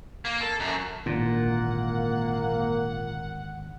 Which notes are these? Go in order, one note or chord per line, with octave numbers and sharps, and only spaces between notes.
A#3
A4
F#2
G#1 A#2 D3 E3 A#3 F#5